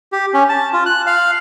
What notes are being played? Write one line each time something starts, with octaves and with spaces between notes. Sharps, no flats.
G4
C#4
A5
F4
F#6
F5